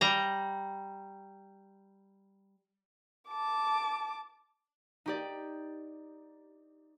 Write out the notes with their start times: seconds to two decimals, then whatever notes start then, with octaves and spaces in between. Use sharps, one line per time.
0.01 G3 A#5
3.29 A5 D6
5.06 D#4 G4 D5